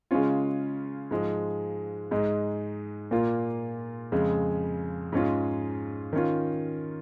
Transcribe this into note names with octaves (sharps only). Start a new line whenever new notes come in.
C#3 G#3 C#4 F4
G#2 F3 G#3
G#2 G#3 D#4
A#2 A#3 F4
F2 C#3 G#3
G#2 G#3 C#4 F4
D#3 C#4 F4